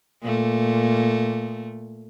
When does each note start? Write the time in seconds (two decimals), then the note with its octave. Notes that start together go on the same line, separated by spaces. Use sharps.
0.23 A#2 A3